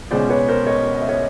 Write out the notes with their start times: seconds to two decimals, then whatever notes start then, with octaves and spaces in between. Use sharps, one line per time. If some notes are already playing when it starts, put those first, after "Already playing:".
0.11 C#2 B2 G#3 C#4 C5 D5
0.30 B4 C#5
0.48 A#4 C5
0.67 C#5 D#5
0.94 D#5
1.01 E5
1.09 C#5 D#5